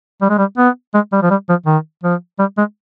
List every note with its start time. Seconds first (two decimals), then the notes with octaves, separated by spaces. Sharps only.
0.21 G3
0.29 G#3
0.38 G3
0.58 B3
0.94 G#3
1.12 G3
1.22 F3
1.30 G3
1.49 F3
1.66 D#3
2.03 F3
2.39 G3
2.58 G#3